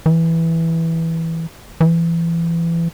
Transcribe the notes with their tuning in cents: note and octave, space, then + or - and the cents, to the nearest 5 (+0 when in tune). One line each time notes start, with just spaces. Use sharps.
E3 -5
E3 +25